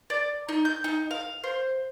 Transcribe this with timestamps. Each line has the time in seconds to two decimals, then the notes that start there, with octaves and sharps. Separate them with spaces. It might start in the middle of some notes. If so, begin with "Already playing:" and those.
0.10 D5
0.49 D#4
0.65 G6
0.84 D#4
1.11 F5
1.44 C5